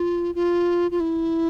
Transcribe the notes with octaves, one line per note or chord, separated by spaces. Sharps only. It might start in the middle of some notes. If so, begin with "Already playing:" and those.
Already playing: F4
F4
F4
E4